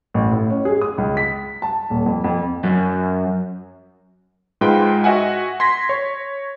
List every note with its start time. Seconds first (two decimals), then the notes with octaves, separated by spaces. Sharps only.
0.14 A1
0.31 A2
0.50 C#4
0.65 G#4
0.81 D#6
0.98 C#2
1.17 B6
1.62 A5
1.90 D#1
2.06 F2
2.24 F2
2.64 F#2
4.61 G#2 G#3 F4 B4 G5
5.04 F#4 D#5 E5 F#5 G#5
5.60 C6 G#6 A#6 B6
5.89 C#5